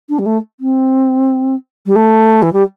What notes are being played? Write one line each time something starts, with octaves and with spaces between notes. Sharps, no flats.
D4
G3
A3
C4
G3
A3
E3
G3